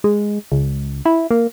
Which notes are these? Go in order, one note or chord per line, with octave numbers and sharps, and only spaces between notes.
G#3
C#2
E4
A#3